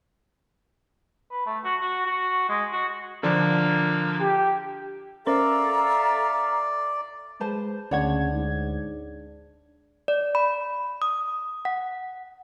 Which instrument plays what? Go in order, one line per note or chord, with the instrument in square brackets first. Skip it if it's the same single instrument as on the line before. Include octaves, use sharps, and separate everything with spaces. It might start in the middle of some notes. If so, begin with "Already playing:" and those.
[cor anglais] B4
A3
F#4
F#4
F#4
G#3
F#4
[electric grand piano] D3 F3 D4 [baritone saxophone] A#3
[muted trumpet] G4
[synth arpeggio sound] C#4 A#4 C5 [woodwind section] A4 E5 F5 [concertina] D5 [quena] A#5
[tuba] G#3 [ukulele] B4 C5 A5
[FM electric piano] D2 G#6 [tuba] C#3 [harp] D4 [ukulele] C#5 F#5
[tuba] G#2
[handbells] D5
B5
D#6
F#5